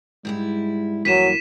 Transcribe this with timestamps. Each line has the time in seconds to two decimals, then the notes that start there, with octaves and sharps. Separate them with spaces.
0.25 G#2 G3 G#3 E4
1.05 G2 E3 F#3 A#3 B6 D#7 E7